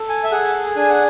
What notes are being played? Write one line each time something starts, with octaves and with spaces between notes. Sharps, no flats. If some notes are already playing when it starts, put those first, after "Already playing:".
Already playing: A4
G#5
E5
G#4 F#5
D4 G#5
F#5